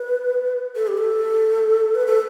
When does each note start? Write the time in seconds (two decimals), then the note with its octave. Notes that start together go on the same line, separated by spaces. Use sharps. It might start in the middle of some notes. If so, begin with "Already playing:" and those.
Already playing: B4
0.76 A4
0.87 G4
0.98 A4
1.95 B4
2.07 A4